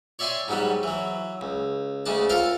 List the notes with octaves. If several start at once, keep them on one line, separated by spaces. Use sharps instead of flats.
C#5 D5 E5 G5 G#5 C6
G#2 F#3 G3 B3
E3 F#3
C#2
D2 C#3 G#3 D4 A5
F4 A4 A#4 F5 G5 A5